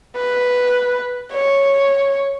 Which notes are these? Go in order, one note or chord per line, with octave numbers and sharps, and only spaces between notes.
B4
C#5